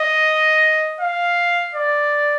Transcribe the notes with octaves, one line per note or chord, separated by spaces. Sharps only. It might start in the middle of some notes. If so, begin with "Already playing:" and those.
Already playing: D#5
F5
D5